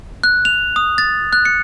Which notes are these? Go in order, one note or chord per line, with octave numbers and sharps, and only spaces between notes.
F#6
F7
D#6
A6
F#6
C#7